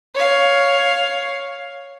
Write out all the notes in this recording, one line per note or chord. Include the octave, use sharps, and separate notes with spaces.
C#5 F5